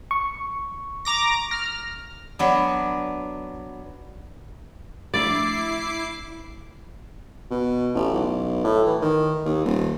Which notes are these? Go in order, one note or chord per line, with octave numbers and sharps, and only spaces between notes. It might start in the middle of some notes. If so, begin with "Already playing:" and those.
C#6
A#5 D6 A#6
F6 A#6
F#3 B3 D4
F3 A3 D4 E4 D5 D6 C7
B2
A1
B1
A2
E3
D#3
D#2
D#1